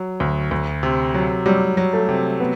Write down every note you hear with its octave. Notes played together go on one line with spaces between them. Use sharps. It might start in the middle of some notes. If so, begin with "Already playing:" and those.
Already playing: F#3
D2
D2
C3
F#3
F#3 G3
F#3
A3
C3
B3